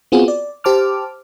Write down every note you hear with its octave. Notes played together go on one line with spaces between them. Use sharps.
B3 C4 F4 F#4 G#4
D5
G4 C5 A5 D6 F6